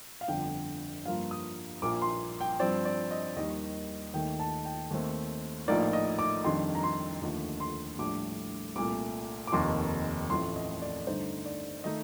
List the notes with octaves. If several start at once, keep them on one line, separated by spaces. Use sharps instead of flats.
F5
G1 F2 D3 G5
G2 F3 A#3 F4 F5
D#6
A#1 A#2 F3 A#3 D6
C6
G5
G2 F3 C4 D5
D5
D#5
D#2 D#3 G3 D#5
D#2 D#3 A3 G5
A5
G5
D#2 D#3 A3 C4
A#1 A2 F3 A#3 D#4 D5
D#5
D6
F2 D#3 G3 D4 F4 C6
A#5
C6
D#2 D3 F3 A3
C6
A#1 A2 G3 D4 D6
C2 A#2 A3 D6
D6
F1 D#2 D#3 A#3 C6
A1 A2 F3 A3 C6
D#5
D5
G2 D3 A3 D#4 C5
D5
D#3 A3 D#4 D#5